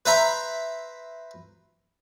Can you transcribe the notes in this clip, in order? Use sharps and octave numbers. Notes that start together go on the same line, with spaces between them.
B4 C5 E5 A#5 B5